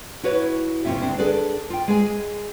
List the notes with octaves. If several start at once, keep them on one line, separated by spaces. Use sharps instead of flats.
E4 F#4 B4 C#5
F2 C3 E3 C#4 F4 E5
D2 G#2 C4 D4
D4 G#4 A4 B4 D5
F4 G5
G#3 G#4 G#5